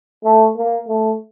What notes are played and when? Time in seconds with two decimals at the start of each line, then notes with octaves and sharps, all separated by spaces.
0.24 A3
0.57 A#3
0.88 A3